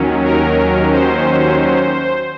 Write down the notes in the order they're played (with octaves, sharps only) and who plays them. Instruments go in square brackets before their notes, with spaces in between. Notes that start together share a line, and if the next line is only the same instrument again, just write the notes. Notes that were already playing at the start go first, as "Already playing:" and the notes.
Already playing: [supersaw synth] D#2 D#3 F#3 C#4
A#4
C5